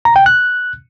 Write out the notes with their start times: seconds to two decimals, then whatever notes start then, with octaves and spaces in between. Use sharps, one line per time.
0.05 A#5
0.16 G5
0.26 F#6